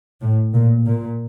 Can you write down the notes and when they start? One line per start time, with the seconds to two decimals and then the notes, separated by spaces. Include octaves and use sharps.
0.22 A2
0.54 A#2
0.86 A#2